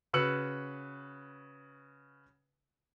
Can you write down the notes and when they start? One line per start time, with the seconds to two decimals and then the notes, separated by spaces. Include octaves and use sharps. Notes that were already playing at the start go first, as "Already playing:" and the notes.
0.13 C#3 F#4 B4 E6 C#7 F#7